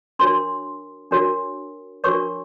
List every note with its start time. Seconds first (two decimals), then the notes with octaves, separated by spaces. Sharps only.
0.19 D4 F#4 A#4 C#5 C6
1.11 D4 F#4 A#4 C#5
2.04 D4 F#4 A#4 C#5 C#6